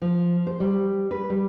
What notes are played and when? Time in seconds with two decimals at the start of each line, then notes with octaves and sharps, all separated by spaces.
0.02 F3
0.47 C5
0.60 G3
1.11 B4
1.30 G3